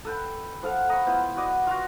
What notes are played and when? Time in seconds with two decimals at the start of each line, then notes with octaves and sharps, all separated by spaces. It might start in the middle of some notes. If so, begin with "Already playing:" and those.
0.05 A4 B4 G5
0.63 F3 A4 F5 F#5
0.88 A#4 D#5 B5 C#6
1.06 B3 E4 F4 C5
1.36 F#4 B4 D5 D#5
1.67 F4 F#4